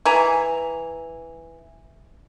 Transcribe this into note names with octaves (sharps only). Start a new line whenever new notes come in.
E3 G#5 A#5